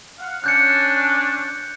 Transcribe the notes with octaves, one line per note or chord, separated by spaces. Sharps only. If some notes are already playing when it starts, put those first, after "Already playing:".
F5 F#5
C#4 D4 F#6 G6 C#7